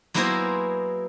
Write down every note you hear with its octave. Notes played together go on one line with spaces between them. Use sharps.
F#3 A#3 B3 E4 G#4 C5